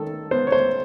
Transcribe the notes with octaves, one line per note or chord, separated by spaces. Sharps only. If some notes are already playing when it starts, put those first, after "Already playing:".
Already playing: D#3 A4
B3 C5
C#5
C5